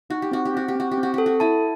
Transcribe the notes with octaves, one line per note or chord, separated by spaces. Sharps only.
D#4 F#4
G4
C4 F#4
G4
C4 F#4
G4
C4 F#4
G4
C4
F#4
G4 A4
F#4
E4 A5